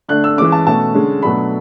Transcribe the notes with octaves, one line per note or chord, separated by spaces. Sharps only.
D3 A3 D4 F#6
E6
E3 G#3 C#4 D6
A5
B2 A3 C#4 A5
D3 G#3 C#4
B2 F#3 A3 D4 B5